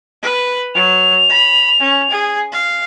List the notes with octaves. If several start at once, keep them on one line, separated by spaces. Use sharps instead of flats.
B4
F#3 F7
B5
C#4
G#4
F5